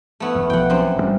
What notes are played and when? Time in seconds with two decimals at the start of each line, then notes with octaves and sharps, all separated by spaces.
0.20 A3 B3 E4
0.35 F#1 E2
0.50 B1 F3 F#5 G5
0.70 F#2 C4
0.96 G#1 B2 G3